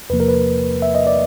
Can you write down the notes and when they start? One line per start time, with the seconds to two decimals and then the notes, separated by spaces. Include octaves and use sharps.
0.10 E2 C3 F3 A#3 B4
0.20 A#4
0.29 B4
0.82 E5
0.95 D#5
1.07 D5